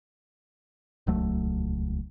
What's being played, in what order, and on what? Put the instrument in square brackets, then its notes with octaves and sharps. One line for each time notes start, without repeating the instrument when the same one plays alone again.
[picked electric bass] D#1 C#2 F#3 A3